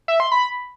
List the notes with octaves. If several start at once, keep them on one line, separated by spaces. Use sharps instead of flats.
E5
C6
B5